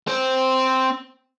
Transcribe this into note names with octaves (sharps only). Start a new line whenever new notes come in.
C4 C5